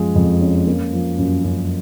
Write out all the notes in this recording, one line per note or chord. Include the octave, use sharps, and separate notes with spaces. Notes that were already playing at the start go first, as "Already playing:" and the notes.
Already playing: F#2 F3 G#3
F2
C#4
A#3
F3
F#2
F#2